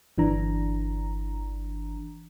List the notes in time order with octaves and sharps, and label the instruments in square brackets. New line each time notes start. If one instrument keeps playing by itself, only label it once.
[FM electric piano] G1 E3 D4 A#5